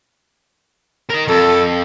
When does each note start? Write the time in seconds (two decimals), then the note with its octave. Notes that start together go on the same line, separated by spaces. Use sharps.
1.10 A#4 D#5
1.28 F2 A4